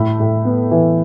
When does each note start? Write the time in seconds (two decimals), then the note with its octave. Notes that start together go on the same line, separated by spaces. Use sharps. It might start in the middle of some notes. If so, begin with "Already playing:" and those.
Already playing: A2 A3 B5
0.20 A2
0.45 B3
0.71 E3